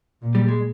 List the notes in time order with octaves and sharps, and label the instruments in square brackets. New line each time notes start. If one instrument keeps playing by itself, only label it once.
[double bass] A#2
[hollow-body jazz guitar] G3
G#3